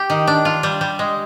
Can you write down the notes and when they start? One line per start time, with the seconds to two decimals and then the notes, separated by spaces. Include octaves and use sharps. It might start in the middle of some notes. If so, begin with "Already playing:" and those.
Already playing: G4
0.10 D#3
0.27 D4
0.45 F4
0.63 G3
0.81 G3
0.99 G#3